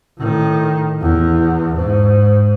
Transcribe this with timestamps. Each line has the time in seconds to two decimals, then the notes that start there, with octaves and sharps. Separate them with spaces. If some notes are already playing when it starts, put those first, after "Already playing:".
0.18 A2 D#3
1.01 E2
1.76 G#2